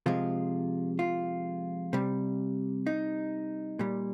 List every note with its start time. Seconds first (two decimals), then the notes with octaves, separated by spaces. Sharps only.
0.06 C3 F3 G#3 F4
0.99 F4
1.93 C3 G3
2.87 D#4
3.79 A#2 G3